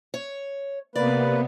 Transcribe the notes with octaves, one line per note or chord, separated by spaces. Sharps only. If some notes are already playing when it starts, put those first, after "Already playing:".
C#5
C3 A#3 B3 B4 D5